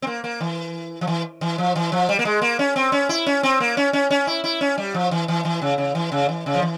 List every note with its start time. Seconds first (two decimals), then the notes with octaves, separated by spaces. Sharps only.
0.02 C4
0.07 A#3
0.24 A#3
0.40 E3
1.01 F3
1.07 E3
1.41 E3
1.58 F3
1.76 E3
1.92 F3
2.09 G3
2.19 A#3
2.25 G#3
2.42 A#3
2.59 C#4
2.76 C4
2.92 C#4
3.09 E4
3.26 C#4
3.43 C4
3.60 A#3
3.77 C#4
3.93 C#4
4.10 C#4
4.27 E4
4.44 E4
4.61 C#4
4.78 G3
4.94 F3
5.11 E3
5.28 E3
5.45 E3
5.62 C#3
5.78 C#3
5.95 E3
6.12 C#3
6.29 E3
6.46 C#3
6.55 F3
6.62 E3